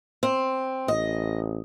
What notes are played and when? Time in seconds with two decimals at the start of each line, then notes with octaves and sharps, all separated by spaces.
0.23 C4
0.88 A1 D#5